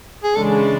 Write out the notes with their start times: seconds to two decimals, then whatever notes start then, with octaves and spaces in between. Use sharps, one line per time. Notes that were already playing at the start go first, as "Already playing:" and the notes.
0.24 G#4
0.35 C#3 E3 G#3 D4 A4